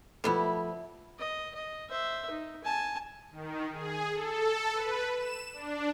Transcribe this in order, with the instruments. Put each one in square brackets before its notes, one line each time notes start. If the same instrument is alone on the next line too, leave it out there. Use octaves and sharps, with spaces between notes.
[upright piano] F3 A3 [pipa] G3 B3 E4
[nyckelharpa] D#5
D#5
C5 E5
D#4
G#5 A5
[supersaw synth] D#3
G#4
A4
B4
E7
D4